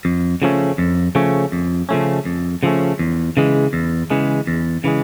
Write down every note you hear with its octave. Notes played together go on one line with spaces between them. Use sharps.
F2
C#3 F3 A3 C#4
F2
C#3 F3 A3 C#4
F2
C#3 F3 A3 C#4
F2
C#3 F3 A3 C#4
E2
C#3 E3 G#3
E2
C#3 E3 G#3
E2
C#3 E3 G#3